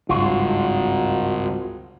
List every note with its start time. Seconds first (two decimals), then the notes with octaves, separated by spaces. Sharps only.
0.09 G#1 C#2 G2 F#3 F4 F#4